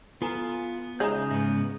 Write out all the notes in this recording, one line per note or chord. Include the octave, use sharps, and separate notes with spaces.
B3 F4 A4 G#5 A#5 F6
C#3 G#3 D#4 C#5 E5 A#5 G6
G#2 B3 E5